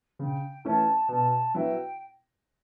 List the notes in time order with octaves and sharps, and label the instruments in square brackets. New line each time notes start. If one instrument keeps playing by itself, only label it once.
[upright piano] C#3 [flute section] G5
[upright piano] E3 A3 C#4 [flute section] A5
[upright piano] B2 [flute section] A5
[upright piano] F#3 B3 E4 [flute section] G5